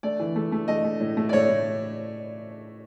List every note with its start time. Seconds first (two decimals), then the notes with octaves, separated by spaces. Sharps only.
0.03 A3 D5
0.20 E3
0.36 A3
0.52 A3
0.68 A3 D#5
0.84 A3
1.00 A2
1.17 A3
1.29 D5
1.33 A2 C#5
1.49 A2